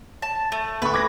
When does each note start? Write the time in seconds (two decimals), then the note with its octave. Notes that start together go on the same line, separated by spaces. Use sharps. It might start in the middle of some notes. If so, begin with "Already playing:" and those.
0.22 A5
0.52 A3
0.82 D2 B4 C#6
0.94 D6 G#6 A#6